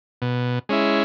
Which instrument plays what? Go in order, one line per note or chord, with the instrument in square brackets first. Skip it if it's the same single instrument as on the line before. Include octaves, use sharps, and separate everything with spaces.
[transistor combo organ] B2
G#3 C#4 E4